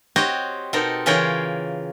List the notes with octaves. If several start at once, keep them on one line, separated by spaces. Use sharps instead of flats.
C4 F#4 G4 C#5 D#5
B2 C4 D#4 A4 A#4
C#3 E3 F4 A#4 C#5 G5